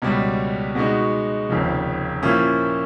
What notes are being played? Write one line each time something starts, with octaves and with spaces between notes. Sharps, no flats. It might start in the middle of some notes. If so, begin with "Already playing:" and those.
C#2 B2 G3
B2 G#3 B3 D#4 F#4
F1 D#2 C#3 F3
A#2 F3 A#3 C#4 E4